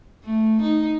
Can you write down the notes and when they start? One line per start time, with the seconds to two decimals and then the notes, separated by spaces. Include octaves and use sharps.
0.24 A3
0.62 D#4